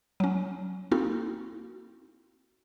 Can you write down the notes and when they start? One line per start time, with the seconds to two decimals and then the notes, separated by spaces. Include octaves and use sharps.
0.20 F#3 C#4
0.91 A#3 C4 D#4 E4 F#4 A4